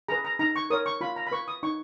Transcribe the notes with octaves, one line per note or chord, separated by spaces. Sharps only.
G#4 B4 A#5
A#5
D#4 A#5
C#6
A#4 C#5 D#6
C#6
F4 B5
A#5
B5
B4 C#6
D#6
D#4 C#6